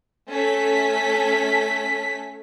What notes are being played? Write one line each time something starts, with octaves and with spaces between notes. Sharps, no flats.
A3 C#4 A4 B6